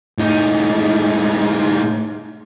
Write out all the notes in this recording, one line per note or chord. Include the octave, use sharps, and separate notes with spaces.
A2 D#4